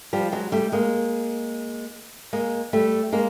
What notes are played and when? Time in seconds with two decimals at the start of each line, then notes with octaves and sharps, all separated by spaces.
0.13 F3 G3
0.32 F#3 G#3
0.52 G3 A3
0.72 G#3 A#3
2.33 G#3 A#3
2.73 G3 A3
3.12 G#3 A#3